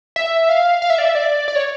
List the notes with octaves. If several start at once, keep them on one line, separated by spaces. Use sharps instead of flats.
E5
F5
F5
E5
D5
E5
D5
D5
C#5